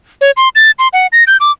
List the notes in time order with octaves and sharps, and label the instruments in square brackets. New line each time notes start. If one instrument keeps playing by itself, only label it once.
[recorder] C#5
C6
A6
C6
F#5
A#6
G6
D6